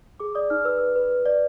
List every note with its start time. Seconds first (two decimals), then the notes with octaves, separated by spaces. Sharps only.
0.20 G#4 D6
0.35 D5 D#6
0.50 D#4 F6
0.65 B4 E6
0.80 B4
0.96 B4
1.11 B4
1.26 D5